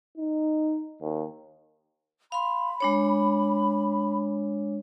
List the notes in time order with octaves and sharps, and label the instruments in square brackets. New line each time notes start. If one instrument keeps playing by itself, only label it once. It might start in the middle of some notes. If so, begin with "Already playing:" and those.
[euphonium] D#4
D#2
[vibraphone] F5 C6 [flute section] B5
[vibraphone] G#3 D4 C#5